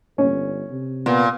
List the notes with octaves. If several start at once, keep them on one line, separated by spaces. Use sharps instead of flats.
G1 C#4
C3
A#2 B3